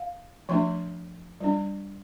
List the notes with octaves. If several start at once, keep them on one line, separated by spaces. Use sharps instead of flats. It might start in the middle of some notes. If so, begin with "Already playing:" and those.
Already playing: F5
F3 A3 D4 C6
G3 D4